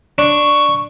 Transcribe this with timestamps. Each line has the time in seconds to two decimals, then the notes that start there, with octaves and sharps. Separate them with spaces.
0.18 D4 C#6